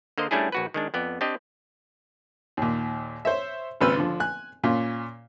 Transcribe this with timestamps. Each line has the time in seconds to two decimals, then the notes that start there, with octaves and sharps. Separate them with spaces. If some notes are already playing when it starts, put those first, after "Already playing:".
0.18 D3 A#3 C5 D#5
0.31 G3 A3 C#4 D4 E4 G#4
0.52 A#1 F#4 B4
0.74 D#3 G#3 D4
0.94 F2 B3 D5
1.21 C4 D4 G4 D#5
2.57 D#2 A#2
3.25 C5 C#5 E5
3.81 G#1 C#3 B4 C5 E6 F6
3.96 D3 F3
4.20 G#5 F#6
4.64 A#2 C#4 F4